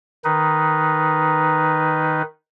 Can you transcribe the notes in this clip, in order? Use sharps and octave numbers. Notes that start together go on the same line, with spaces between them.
D#3 D#4 B4